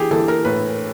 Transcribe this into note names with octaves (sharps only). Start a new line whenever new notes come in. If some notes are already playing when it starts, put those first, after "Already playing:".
Already playing: E3 G4 G#4
E3 A4
A#4
A2 B4